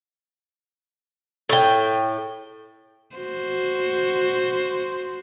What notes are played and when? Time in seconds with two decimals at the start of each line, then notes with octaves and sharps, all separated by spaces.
1.49 A2 G5
3.16 F#4 C5